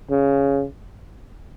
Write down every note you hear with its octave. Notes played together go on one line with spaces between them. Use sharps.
C#3